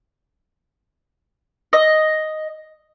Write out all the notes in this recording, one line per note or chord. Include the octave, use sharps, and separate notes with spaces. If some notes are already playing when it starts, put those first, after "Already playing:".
D#5